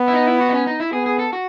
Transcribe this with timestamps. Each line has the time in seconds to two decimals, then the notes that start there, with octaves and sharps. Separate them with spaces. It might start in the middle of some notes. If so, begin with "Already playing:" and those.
Already playing: B3
0.08 E4
0.13 D#4
0.27 E4
0.40 F#4
0.48 D#4
0.53 C#4
0.66 D#4
0.80 E4
0.92 B3 G#4
1.06 G#4
1.19 A4
1.33 F#4